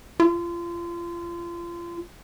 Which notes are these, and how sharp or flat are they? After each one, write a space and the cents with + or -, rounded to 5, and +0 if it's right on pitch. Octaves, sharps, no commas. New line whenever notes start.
F4 -30